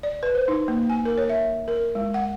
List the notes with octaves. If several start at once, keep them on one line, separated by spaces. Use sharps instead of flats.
D5
B4
C5
D#4
A#3
G#5
A#4
C#5
E5
A#4
G#3
F#5